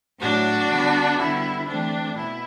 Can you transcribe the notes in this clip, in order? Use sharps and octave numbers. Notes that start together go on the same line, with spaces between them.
A2 F#3 A3 D4 F#4
D3 G3 B3
D3 G3 B3 E4
E3 A3 C4 D4
B2 E4